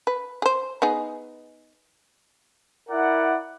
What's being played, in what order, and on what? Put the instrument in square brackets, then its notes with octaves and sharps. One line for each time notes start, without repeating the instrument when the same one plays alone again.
[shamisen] B4
G#4 C5
B3 D#4 G#4
[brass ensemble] E4 A#4 D5 F#5